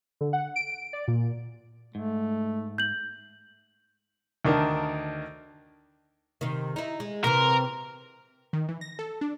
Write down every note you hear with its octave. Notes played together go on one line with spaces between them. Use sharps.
D3
F#5
D7
D5
A#2
G#2 A3
G6 F#7
D2 D#3 D4 A#4
C3 D#3
D#4 E4
G#3
C3 E3 C4 A#4
D#3
E3
A#6
A4
D4